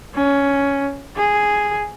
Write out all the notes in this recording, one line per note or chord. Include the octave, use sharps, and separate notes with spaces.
C#4
G#4